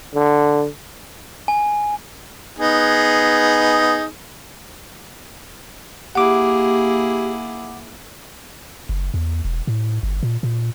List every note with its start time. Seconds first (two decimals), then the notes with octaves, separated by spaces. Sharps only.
0.15 D3
1.48 G#5
2.58 B3 D#4 G#4
6.15 A#3 E4 G4 G#4 F#5 D6
8.89 F#1
9.14 E2
9.45 E1
9.67 A2
10.03 G1
10.23 A#2
10.43 A#2